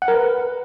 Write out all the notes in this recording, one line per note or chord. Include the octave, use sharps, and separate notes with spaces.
F#5
A#4
B4